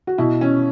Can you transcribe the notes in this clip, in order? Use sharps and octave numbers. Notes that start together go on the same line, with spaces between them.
F#4
B2 E4
C#4